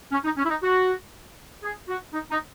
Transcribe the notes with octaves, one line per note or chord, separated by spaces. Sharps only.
C#4
D#4
C#4
E4
D#4
F#4
G#4
F#4
D#4
D#4